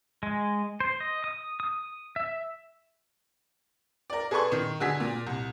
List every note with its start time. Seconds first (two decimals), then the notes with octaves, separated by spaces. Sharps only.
0.23 G#3
0.80 C5
1.00 D#5
1.24 D#6
1.60 D#6
2.16 E5
4.10 A#4 D5
4.31 G#4 A4 B4 D5 C6 C#6
4.52 D#3
4.80 D3 F#4 G#4 B6
5.00 A#2
5.27 C2